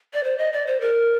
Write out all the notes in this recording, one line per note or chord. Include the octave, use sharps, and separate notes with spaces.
D5
C5
D#5
D5
C5
A#4